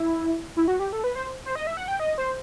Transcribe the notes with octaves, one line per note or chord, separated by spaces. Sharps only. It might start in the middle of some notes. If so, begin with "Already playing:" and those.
Already playing: E4
E4
F#4
G4
A4
B4
C5
C5
D#5
E5
F#5
G5
D#5
C5